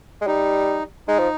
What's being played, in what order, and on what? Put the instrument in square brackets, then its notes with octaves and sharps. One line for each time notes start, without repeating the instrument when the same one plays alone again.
[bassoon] G#3
[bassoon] G3 [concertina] D#4
[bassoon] G#3 [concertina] D#4
[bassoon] F3